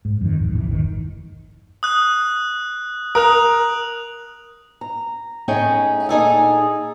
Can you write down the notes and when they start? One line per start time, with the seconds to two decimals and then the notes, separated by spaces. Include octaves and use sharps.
0.05 G#2
0.21 F2 D#3
0.39 D1
0.53 A1 E2 D#3 E3
0.71 G1 D#3
1.83 D#6 F#6
3.15 A#4 D#6 F#6 F7
4.81 A#5
5.48 A2 C#4 D#4 G#4 G5
6.09 A#2 D#4 G#4 A4